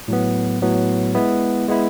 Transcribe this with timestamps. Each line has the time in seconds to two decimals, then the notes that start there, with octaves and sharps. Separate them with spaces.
0.08 A2 F#3 B3
0.62 A2 F#3 B3
1.15 G#3 B3 E4
1.68 G#3 B3 E4